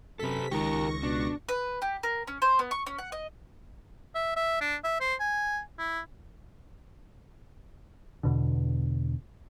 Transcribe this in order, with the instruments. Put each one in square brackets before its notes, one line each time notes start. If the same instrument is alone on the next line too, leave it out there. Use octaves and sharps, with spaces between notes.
[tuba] F#2 [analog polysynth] C3 B6 [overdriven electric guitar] A4 B4
[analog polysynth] C#2 C#6 A#6 [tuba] D#3 [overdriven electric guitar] G4 A#4
[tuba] B2 [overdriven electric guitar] D4
[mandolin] B4
G4
A#4
C#4
C5
B3
C#6
C#4
F#5
D#5
[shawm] E5
E5
D4
E5
C5
G#5
E4
[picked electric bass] E2 B2 D3